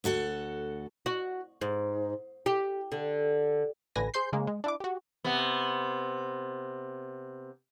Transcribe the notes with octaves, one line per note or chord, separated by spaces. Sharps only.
D2 F#4 A4 F#5
F#4
G#2
G4
D3
A1 D3 B4 G#5 A#6
G#4 C5 C6 G6 C7
C#3 G#3 A#3
G#3
D4 E4 D6
F#4 G4
C3 B3